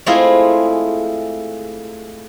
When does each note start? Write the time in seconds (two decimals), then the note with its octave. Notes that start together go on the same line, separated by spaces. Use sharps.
0.06 G#3 A3 C4 E4 F4 G#4